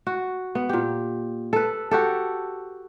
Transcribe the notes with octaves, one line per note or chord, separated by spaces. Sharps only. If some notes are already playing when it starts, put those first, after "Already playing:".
F#4
B3
A#2 G4
A4 B4
F#4 G4 A4